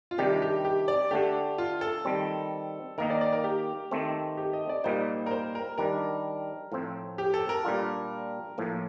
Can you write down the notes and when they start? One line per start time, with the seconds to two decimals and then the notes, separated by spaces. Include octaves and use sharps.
0.11 F4
0.18 C3 D#3 G3 D4 G4
0.42 G4
0.65 G4
0.88 D5
1.11 D3 A3 D4 G4
1.58 F4
1.81 A4
2.05 D#3 G3 C4
2.98 D#3 A#3 D#4 A#4
3.10 D5
3.21 D5
3.32 A#4
3.44 G4
3.91 D#3 A3 C4
4.37 G4
4.53 D#5
4.69 D5
4.84 A#2 G3 A#3 D#4 C5
5.26 A#4
5.31 C5
5.55 A#4
5.78 D#3 G3 D4 A#4
6.72 A2 F3 C4
7.18 G4
7.34 A4
7.49 A#4
7.64 A#2 G3 D4 F4
8.58 A2 F3 A#3